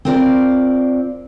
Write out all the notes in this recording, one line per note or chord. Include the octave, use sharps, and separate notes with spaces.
C4 F4 A#4 C5 D5